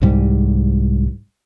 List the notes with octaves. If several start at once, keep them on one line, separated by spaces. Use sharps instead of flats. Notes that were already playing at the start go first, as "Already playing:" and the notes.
C2 G#2 G3